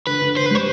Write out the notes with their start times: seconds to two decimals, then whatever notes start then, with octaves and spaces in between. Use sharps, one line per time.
0.07 D3 B4
0.22 D3
0.36 D3 C5
0.46 B4
0.51 G3 C5